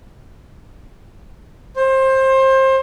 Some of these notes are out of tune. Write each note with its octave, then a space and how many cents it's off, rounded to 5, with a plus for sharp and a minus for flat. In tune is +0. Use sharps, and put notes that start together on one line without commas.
C5 +25